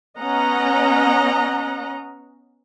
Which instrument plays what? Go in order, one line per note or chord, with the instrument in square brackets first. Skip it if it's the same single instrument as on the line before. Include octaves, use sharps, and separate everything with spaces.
[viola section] B3 C#4 D#5 F#5 A#5